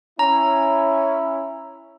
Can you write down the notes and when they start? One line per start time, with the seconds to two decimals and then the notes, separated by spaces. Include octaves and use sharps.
0.19 C#4 E4 A#5